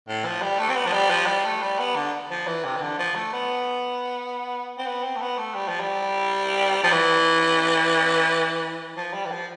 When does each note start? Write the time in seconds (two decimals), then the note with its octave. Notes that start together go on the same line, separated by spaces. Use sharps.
0.08 A2
0.25 F3
0.42 G3
0.59 A3
0.69 C4
0.76 B3
0.86 F3
0.93 G3
1.10 F3
1.27 G3
1.45 A3
1.62 G3
1.79 B3
1.96 D3
2.31 F3
2.47 E3
2.65 C3
2.76 E3
2.81 D3
2.99 F3
3.16 A3
3.33 B3
4.78 C4
4.87 B3
5.03 C4
5.16 A3
5.21 B3
5.38 A3
5.55 G3
5.68 F3
5.80 G3
6.84 F3
6.92 E3
8.97 F3
9.14 G3
9.26 E3
9.31 F3